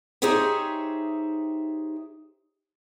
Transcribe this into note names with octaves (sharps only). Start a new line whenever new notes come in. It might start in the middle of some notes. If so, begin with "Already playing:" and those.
D#4 G4 G#4 C5 C#5 E5